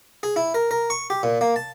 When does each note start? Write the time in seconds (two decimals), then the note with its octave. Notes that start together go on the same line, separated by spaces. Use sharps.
0.23 G#4
0.36 E4
0.54 A#4
0.71 A#4
0.90 C#6
1.10 G4
1.23 A#2
1.41 A#3
1.56 A5